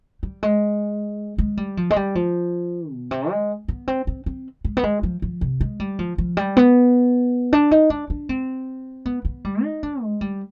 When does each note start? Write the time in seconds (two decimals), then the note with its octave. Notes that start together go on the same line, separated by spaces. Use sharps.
0.23 G3
0.43 G#3
1.38 G#3
1.57 G3
1.77 F3
1.90 G#3
1.96 G3
2.15 F3
2.92 B2
3.11 C3
3.30 G#3
3.68 B3
3.88 C4
4.07 C4
4.26 C4
4.65 G#3
4.77 B3
4.83 G#3
5.03 F3
5.22 F3
5.41 C3
5.61 G#3
5.80 G3
5.99 F3
6.18 F3
6.37 G3
6.57 B3
7.53 D4
7.71 D#4
7.90 D4
8.10 D4
8.29 C4
9.06 B3
9.25 B3
9.45 G3
9.63 D#4
9.83 D4
10.02 G#3
10.21 G3